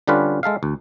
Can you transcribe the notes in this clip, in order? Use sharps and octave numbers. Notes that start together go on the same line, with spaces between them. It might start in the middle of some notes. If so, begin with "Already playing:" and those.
D3 G3 C#4 D4 F4 B4
G#3 A4 E5 F5
D2